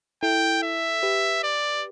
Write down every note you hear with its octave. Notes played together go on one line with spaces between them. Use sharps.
E4 A4 G5
E5
G4 B4
D5